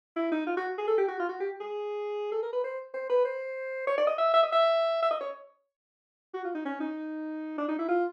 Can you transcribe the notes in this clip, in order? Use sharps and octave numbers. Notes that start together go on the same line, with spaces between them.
E4
D#4
F4
F#4
G#4
A4
G4
F#4
F4
F#4
G4
G#4
A4
A#4
B4
C5
C5
B4
C5
C#5
D5
D#5
E5
E5
D#5
E5
E5
D#5
C#5
F#4
F4
D#4
C#4
D#4
D4
D#4
E4
F4